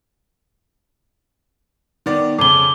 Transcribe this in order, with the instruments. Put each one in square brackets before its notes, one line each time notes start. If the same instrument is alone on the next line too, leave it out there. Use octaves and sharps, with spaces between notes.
[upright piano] D#3 B3 D5
[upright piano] F2 C#3 [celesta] D6 G7